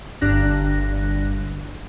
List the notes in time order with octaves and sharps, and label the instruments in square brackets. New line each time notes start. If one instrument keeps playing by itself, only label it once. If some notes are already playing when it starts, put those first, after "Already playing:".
[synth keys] G1 G2 D3 D4 F#6 A#6